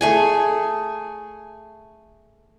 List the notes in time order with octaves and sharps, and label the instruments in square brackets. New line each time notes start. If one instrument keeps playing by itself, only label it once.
[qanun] A3 G#4 G#5